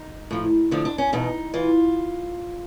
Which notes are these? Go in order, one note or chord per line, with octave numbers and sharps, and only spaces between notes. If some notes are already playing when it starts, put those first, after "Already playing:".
Already playing: D#4
A2 F3
D2 D3 F3 D4
D4
C#4
E2 B2 D#4
E3 F4